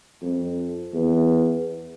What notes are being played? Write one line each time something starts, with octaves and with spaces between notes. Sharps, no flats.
F2
E2